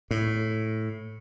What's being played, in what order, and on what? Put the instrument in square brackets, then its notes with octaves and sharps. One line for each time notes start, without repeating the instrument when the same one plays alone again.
[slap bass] A2